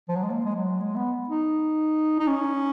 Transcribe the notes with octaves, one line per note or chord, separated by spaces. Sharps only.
F3
F#3
G#3
A#3
G#3
F#3
G#3
B3
D#4
D#4
C#4